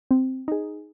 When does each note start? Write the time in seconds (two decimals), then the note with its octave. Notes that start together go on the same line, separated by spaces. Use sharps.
0.11 C4
0.48 D#4 G#4